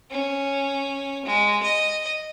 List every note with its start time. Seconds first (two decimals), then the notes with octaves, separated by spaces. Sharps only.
0.11 C#4
1.25 G#3
1.63 D#5